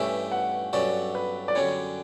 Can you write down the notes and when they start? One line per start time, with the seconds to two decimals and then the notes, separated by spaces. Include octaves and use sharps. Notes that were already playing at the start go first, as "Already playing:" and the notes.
Already playing: G2 E3 A3 C#4 G4 E5
0.31 F#5
0.73 G2 F#3 C#4 F#4 A4 D5
1.15 B4
1.48 D5
1.55 F#2 D3 G3 C#4 C#5